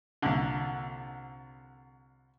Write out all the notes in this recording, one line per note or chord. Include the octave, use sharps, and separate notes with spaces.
C2 A#2 D3